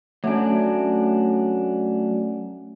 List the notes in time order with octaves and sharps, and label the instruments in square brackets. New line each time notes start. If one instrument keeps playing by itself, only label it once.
[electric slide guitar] F#3 D4 [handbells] A3 C#4